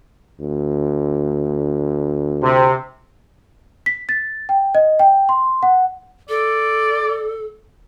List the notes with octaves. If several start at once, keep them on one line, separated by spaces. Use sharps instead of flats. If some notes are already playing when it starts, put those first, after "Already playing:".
D2
C3
B6
A6
G5
D#5
G5
C6
F#5
A4 D5